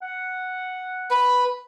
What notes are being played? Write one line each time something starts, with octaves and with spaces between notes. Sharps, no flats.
F#5
B4